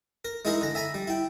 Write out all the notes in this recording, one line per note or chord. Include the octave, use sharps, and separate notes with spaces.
A#4
G#3 D#4 E4 G#4 A#4 D#5
D3 A#5
E5 G#5 A#5 B5
G3
E4 G5